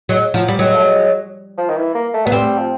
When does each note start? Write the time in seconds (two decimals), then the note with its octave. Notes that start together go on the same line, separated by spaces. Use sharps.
0.09 F#3 G#3
0.34 F3 F#3
0.48 G3
0.59 F#3 G#3
0.75 A3
0.83 G#3
1.58 F3
1.69 D#3
1.77 E3
1.95 A#3
2.14 A3
2.26 F#3 B3
2.32 G3 C4
2.58 F3